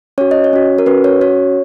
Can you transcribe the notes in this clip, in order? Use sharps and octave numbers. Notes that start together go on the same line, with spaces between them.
C#4 F#4 C#5
D#5
C#5
C#4 F#4
A#4
C#4 F#4 B4
C#5
C#4 F#4 C#5